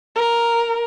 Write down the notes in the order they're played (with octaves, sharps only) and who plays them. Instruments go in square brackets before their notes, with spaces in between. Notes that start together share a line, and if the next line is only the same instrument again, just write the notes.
[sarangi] A#4